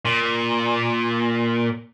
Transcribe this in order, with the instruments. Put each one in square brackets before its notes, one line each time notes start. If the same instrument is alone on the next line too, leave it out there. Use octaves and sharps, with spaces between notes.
[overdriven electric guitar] A#2